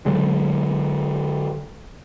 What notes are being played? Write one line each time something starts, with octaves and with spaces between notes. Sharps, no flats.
D3 F#3 G#3